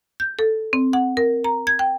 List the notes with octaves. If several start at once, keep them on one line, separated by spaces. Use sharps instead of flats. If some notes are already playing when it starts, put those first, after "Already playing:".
G6
A4
C4
F#5
A#4
A#5
G#6
G5